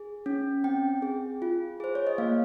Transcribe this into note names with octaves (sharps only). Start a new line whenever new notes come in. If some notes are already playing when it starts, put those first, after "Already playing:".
Already playing: G#4
C#4
C4 G5
G#4
F4
G#4 C5
C#5
D#5
A#3 F5